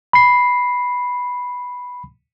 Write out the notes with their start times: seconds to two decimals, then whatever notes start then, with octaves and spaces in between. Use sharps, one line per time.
0.13 B5 C7